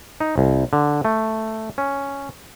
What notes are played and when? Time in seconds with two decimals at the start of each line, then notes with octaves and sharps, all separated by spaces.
0.20 D#4
0.38 C2
0.73 D3
1.05 A3
1.78 C#4